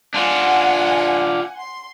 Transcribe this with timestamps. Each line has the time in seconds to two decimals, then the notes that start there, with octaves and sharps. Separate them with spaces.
0.14 D4 F4 F#5 G#5
1.59 C6